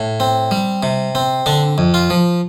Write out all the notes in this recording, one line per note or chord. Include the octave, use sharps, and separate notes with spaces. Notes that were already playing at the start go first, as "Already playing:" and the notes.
Already playing: A2
C4
G3
C3
C4
D3 D4
F2
F4
F3